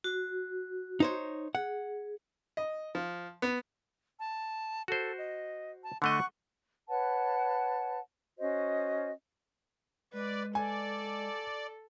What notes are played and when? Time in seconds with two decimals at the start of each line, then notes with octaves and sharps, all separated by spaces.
0.04 F#4
1.00 D#4 C5 C#5
1.55 G#4 F#5
2.57 D#5
2.95 F3
3.42 B3
4.19 A5
4.88 F#4 A4 C5
5.18 D#5
5.84 A5
6.02 D3 A3 D#5 F#5 C#6 F#6
6.89 B4 C#5 F#5 A5
8.39 C#4 F#4 C5 D#5
10.13 G#3 B4 D5
10.55 A4 D5 G#5